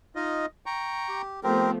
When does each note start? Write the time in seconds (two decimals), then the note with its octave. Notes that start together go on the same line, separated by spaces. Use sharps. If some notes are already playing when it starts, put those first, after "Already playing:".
0.15 D#4 F4 D#5
0.66 G5 A#5 C#6
1.08 G4
1.43 F3 A3 B3 C4 G4 A#4